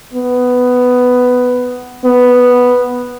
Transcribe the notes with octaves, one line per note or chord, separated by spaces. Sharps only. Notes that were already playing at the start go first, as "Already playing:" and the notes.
B3
B3